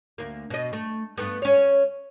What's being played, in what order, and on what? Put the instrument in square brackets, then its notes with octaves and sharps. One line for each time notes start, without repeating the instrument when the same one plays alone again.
[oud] D2 A#3
B2 D#5
A3
G2 A3 B3
C#4 C#5